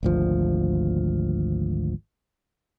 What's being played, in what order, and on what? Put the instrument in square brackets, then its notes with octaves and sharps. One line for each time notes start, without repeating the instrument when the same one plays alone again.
[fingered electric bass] G#1 D2 F3